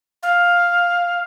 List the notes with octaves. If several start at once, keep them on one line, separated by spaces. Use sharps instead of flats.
F5